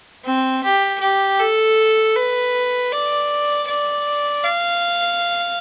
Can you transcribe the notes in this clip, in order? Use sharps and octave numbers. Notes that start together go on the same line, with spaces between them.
C4
G4
G4
A4
B4
D5
D5
F5